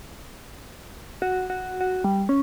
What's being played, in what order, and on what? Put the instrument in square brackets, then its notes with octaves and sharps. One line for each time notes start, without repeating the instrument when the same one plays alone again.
[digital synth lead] F#4
F#4
F#4
G3
C#4